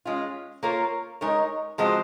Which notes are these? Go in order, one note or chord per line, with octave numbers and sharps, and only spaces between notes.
G#3 C#4 F4
A#3 F4 A#4 C#5
G#3 D#4 A#4 C#5
F3 G#3 C4 F#4 C5